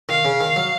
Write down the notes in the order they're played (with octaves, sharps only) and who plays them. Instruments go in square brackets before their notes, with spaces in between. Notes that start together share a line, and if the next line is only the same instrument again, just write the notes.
[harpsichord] D#3 [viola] F5
[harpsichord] C#3
D#3
F#3